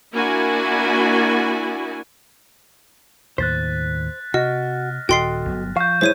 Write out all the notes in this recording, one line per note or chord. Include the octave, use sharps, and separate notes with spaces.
A#3 D4 E4 F#4 G#5
D#2 A2 D#3 C5 F#6 A6 B6
C3 F#4 D#5 F6 A#6
D#1 F#4 A4 D#5 G5 C6 C7
G1 F#3 B3
F3 F5 C#6 G6
F#2 G#3 E4 C5 C#5 D#7